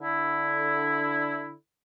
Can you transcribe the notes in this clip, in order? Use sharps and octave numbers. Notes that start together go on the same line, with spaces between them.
D3 E4